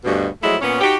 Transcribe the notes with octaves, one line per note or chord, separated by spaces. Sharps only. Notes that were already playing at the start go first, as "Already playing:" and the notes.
D2 G2 B2
F3 F#3 G#3 A3 E4
A#2 B3 C#4
D#4 F#4 G4